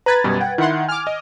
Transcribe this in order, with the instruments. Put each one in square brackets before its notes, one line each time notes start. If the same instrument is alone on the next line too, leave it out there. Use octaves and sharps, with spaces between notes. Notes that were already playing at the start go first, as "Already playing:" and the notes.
[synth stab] B4 [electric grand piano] A#5 G#6 A6
[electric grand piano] F#2 B2 G3
F#5 G5
[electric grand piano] D#3 [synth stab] E4 F#5 C6
[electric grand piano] G#5 [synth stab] D6 F6
[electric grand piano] D#5